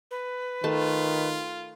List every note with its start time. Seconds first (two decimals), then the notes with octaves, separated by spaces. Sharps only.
0.11 B4
0.64 D#3 A3 F4 A5